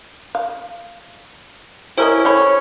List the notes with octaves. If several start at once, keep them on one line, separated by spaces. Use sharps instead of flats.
F5
C#4 E4 G4 A#4 C5 D#5
A3 G4 C#5 B5